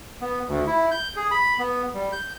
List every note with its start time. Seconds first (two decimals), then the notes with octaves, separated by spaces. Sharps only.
0.21 B3
0.48 D2
0.67 E4
0.91 G6
1.17 G#4
1.31 B5
1.59 B3
1.94 G3
2.12 G6